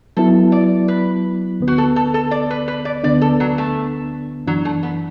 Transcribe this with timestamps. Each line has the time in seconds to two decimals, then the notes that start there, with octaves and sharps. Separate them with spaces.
0.17 F#3 B3 E4 A4
0.52 D5
0.88 B4
1.60 D2 D3 B3
1.67 F#4
1.78 A4
1.96 A4
2.14 A4
2.31 D5
2.50 B4
2.68 B4
2.85 D5
3.04 D2 D3 B3 D4 D5
3.22 A4
3.40 F#3
3.58 A3
4.47 F#2 E3 F#3 D4
4.65 A3
4.83 B3